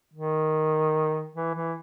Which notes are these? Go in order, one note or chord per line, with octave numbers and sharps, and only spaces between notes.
D#3
E3
E3